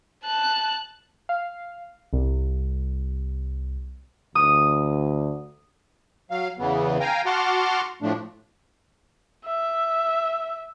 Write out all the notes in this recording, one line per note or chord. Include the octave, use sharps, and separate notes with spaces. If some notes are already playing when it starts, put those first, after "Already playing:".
A5 F#6
F5
C2
D2 D#6
F#3 F5
E2 C#3 E3 B3
F5 G5 G#5 A#5
F#4 F#5 A5 C6 D6 F6
A2 F3 A3 D4
E5